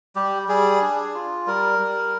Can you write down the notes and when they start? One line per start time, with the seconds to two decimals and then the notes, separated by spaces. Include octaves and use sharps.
0.16 G3 G4
0.48 G3 G#4
0.81 D4
1.14 F4
1.47 G3 A#4
1.79 G3